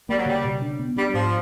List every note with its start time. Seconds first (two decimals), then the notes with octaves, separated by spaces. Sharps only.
0.09 G3 A#3
0.18 F#3
0.26 C#3 G3
0.44 B2
0.62 D4
0.79 B3
0.97 G3 D4
1.14 G#2 F3